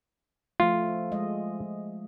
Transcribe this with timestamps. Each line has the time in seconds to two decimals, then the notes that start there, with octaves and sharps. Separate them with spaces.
0.60 F3 A3 F4
1.12 G#3 D#5